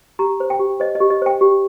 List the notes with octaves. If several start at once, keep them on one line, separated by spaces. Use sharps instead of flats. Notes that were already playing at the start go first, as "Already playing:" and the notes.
G4 A#5
C5
G5
G4
C5 D#5
D#5
G4
D#5
C5 G5
G4